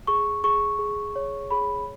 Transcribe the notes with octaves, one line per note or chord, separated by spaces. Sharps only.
G#4 C#6
G#4 C#6
G#4
C#5
G#4 B5